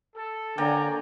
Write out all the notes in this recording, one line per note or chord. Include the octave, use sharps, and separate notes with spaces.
A4
D3 A#3 C#5 D5 G5 G#5 A#5